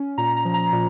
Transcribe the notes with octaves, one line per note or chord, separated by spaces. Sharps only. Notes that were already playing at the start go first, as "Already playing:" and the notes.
Already playing: C#4
A#2 A#5
A#5
F3
A#5
A#2